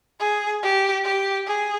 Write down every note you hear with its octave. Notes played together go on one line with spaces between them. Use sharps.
G#4
G4
G4
G#4